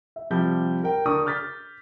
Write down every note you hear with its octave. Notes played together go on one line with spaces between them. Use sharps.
E5
C3 F3 G3 G6
A#4 G5
D3 D4 A#4 C#6 D#6
D6 F6 G6 A6 B6